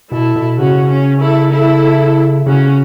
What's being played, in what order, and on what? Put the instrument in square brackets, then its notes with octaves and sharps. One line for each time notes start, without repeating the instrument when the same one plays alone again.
[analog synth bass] B2 [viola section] E4 A4
[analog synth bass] B2
[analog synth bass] C#3 [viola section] C#4 F#4
[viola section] C#4
E4 A4
E4 A4
[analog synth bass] C#3 [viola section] C#4 F#4